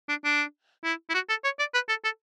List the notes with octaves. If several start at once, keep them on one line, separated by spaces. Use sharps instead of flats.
D4
D4
E4
E4
F#4
A4
C#5
D5
B4
A4
A4